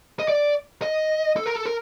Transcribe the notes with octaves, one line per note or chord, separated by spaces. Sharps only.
D#5
D5
D#5
A4
A#4
A4
A#4